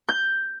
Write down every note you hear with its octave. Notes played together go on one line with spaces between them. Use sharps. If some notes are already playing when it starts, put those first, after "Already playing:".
G6